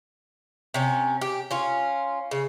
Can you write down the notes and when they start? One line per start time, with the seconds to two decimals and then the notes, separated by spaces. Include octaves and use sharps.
0.74 C3 C#4
1.21 G4
1.51 C#4 F4
2.31 C#3